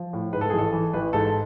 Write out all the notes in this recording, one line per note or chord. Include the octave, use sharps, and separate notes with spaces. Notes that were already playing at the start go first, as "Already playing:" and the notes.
Already playing: F3
A2
G#2 B4
A4
A1 G#4
A4
E3
A1 B4
G#2 A4